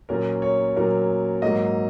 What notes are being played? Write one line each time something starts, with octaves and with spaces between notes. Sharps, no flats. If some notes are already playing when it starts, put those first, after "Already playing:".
A#2 F#3 A#3 C#4 A#4
C#5
A#2 F#3 A#3 C#4 A#4
G#2 F#3 A#3 D#5